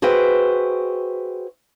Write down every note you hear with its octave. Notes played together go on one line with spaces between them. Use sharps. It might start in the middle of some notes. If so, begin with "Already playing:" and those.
F#4 G#4 B4 C5 E5 G5